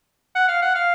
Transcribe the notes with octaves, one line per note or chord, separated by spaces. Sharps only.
F#5
F5
F#5
F5